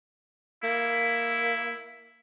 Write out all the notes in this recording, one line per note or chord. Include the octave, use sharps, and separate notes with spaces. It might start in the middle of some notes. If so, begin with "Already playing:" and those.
A#3 E4